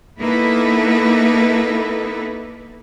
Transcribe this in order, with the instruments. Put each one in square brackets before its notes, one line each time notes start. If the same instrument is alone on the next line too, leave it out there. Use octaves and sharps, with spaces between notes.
[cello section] A#3 B3 D#4 E4 A4 B4